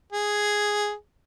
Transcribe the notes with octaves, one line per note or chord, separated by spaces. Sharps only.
G#4